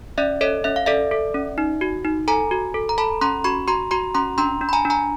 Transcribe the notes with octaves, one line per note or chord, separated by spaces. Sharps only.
C#4 D5 E5
A4 C#5 D#5
C#4 E5
F5
A4 D5 E5
A4
C#4
D#4
F#4
D#4
A4 G#5 A#5
F#4
A4
A#5
A4 A5 B5
C#4 A#5 C6
F#4 B5 C#6
F#4 A#5 C6
F#4 A#5 C6
C#4 A#5 C6
D4 A#5 C6
D4
B5
G#5 A#5
D4
G#5 A#5